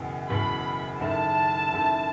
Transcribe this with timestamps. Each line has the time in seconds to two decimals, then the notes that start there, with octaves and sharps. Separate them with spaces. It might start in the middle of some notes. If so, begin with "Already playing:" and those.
Already playing: F#1 E2 B2
0.30 F#1 E2 B2 B5
1.00 F#1 F#2 D#3 A3 E4 A5
1.72 F#1 F#2 D#3 A3 E4